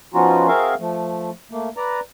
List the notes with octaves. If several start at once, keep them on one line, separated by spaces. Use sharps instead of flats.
F3 B3 C#4 D#4 F4 F#4
C4 F#4 G#4 A#4 E5 F5
F3 A3
A3 A#3
B4 D5 A#5